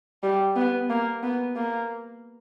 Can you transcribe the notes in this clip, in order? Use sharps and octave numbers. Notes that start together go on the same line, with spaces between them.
G3
B3
A#3
B3
A#3